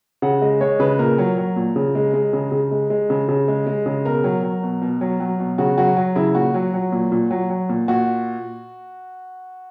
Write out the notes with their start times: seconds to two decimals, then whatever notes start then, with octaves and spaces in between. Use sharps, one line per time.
0.22 C#3 F#5
0.42 G#3 D#5
0.61 G#3 C#5
0.80 C#3 B4
0.99 A#2 A#4
1.18 F#3
1.38 F#3
1.56 A#2
1.76 C#3
1.95 G#3
2.14 G#3
2.33 C#3
2.52 C#3
2.71 G#3
2.90 G#3
3.10 C#3
3.29 C#3
3.48 G#3
3.67 G#3
3.86 C#3
4.05 B2 A#4
4.24 F#3
4.44 F#3
4.63 B2
4.82 B2
5.01 F#3
5.20 F#3
5.40 B2
5.58 C#3 F#4
5.78 F#3 F#4
5.97 F#3
6.16 C#3 E4
6.35 A#2 F#4
6.54 F#3
6.74 F#3
6.92 A#2
7.12 A#2
7.31 F#3
7.50 F#3
7.69 A#2
7.88 A#2 F#4